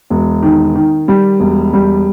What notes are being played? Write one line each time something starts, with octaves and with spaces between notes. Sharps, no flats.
E1
D#3
D#3
G3
E1
G3